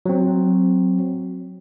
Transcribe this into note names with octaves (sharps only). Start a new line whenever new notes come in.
F#3 C4